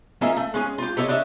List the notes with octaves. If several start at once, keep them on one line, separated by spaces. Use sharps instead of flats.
A#3 C#4 F4 G#4 D#5 E5
A3
G#3 C#4 G#4
F4 G4
G4 A4 C#5 D#5
D4 C#5 D#5 E5